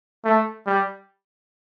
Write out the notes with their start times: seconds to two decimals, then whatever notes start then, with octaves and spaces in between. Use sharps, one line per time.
0.25 A3
0.67 G3